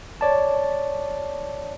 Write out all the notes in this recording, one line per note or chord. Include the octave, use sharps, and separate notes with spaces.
C#5 D5 A5